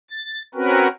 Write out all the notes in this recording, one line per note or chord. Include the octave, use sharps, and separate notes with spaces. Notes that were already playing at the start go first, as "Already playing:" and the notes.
A6
C4 C#4 F#4 A#4 B4